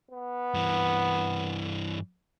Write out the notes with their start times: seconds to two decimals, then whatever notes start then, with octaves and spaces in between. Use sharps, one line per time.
0.11 B3
0.54 G2 E3